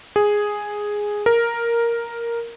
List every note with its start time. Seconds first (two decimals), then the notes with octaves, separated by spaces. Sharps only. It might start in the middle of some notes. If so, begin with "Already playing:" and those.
0.16 G#4
1.26 A#4